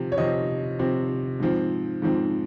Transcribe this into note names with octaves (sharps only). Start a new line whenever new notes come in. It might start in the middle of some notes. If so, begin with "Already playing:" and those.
Already playing: C3 F3 C4
C#5
C3 F3 C4 D#5
C3 F3 C4
G#2 F3 C4
G#2 F3 C4